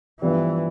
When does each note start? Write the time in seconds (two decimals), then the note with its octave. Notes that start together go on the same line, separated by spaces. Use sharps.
0.20 G2 E3 F3 B3 D4 G4